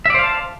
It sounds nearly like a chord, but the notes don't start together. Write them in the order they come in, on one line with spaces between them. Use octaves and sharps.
E5 D5 C5 F5 A5